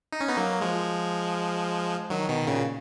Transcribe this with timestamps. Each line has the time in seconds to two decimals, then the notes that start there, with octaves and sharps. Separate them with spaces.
0.13 D#4
0.20 C#4
0.28 B3 D#4
0.37 F#3 A#3
0.61 F3 G#3
2.10 D#3 F#3
2.29 B2 D#3
2.47 A#2 C#3